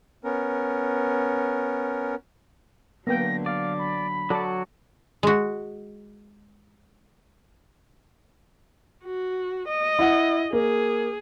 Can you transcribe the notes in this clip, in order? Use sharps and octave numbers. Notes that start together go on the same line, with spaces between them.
B3 C#4 A#4
D3 F#3 A#3 B3 G5 A#6
D5 F5
B5
F#3 F#4 A4 D5
G#3 F#4
F#4
D#5
E4 F#5
A#3 G#4